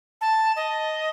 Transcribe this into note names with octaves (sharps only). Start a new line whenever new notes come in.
A5
D#5